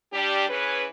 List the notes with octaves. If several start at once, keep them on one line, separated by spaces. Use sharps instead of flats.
G3 D4 G4
E3 C#4 G#4 B4